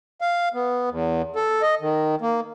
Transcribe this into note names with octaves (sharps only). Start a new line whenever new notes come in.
F5
B3
E2
A4
D#5
D#3
A#3